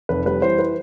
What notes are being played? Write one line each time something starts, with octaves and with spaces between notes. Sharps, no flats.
F1 B4
G3 B4
E3 C5
B4